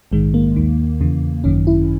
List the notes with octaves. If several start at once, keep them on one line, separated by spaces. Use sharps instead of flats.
A#1 G#2 D#3 G#3
A#3
D#2 D#3
E2 C#3 E3
G#1 F#2 D#3 C#4
E4